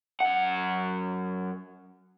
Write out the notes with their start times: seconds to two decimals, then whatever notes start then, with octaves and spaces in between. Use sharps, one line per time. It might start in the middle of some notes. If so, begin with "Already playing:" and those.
0.20 F#2 F#5